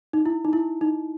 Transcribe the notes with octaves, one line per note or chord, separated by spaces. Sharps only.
D#4
E4
D#4
E4
D#4